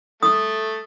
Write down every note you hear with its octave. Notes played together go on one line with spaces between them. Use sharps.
A3 D#6